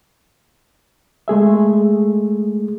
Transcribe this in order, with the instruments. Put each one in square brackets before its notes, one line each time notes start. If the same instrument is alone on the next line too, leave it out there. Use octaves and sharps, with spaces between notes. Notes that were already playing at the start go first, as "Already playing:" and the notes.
[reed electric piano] G#3 A3 G#4 E5